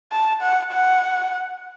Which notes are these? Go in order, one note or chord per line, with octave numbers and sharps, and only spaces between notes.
A5
F#5
F#5